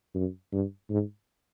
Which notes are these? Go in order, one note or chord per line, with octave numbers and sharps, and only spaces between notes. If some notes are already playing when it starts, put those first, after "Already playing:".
F#2
G2
G#2